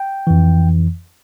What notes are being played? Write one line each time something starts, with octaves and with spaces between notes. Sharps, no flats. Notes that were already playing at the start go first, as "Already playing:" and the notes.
Already playing: G5
F2 E3